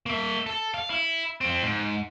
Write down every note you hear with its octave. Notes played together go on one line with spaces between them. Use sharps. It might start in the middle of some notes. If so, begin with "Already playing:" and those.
A#3 E5
A4
F5
E4
F3 C4
G#2